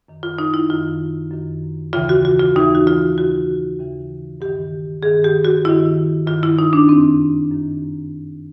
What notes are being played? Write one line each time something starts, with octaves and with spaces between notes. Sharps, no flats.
F#2 D#3
F4
D#4
E4
F#2 D#3 F4
F#2 D#3
D#2 C#3 E3 F4
F#4
F#4
F4
D#2 C#3 E3 D#4
F#4
F4
D#2 C#3 E3 F#4
D#2 C#3 E3
G2 D#3 G4
G2 D#3 G#4
G4
F#4
G2 D#3 E4
G2 D#3 F4
E4
D#4
D4
F#2 D#3 C4
F#2 D#3